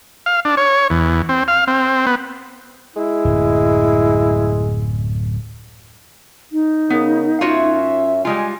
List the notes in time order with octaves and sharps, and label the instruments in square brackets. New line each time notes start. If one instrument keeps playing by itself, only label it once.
[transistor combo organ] F5
D4
C#5
E2
C4
F5
C4
B3
[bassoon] G#3 [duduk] E4
[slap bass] D1 F#2
[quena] D#4
[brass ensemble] C#3 A#4 [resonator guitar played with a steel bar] B3
[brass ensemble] F#2 C#4 E5 [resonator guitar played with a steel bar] F4 F#4 C#5
[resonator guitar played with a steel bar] G3 G#3 F4 [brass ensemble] G#5